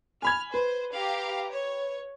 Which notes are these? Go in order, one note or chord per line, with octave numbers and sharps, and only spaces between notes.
G#5 B5 F6 G#6
B4 C5
G4 F5 A#5
C#5